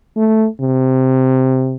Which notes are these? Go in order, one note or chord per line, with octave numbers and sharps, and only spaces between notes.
A3
C3